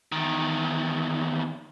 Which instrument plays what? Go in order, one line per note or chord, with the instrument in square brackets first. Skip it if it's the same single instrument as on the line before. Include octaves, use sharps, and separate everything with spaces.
[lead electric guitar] E2 D#3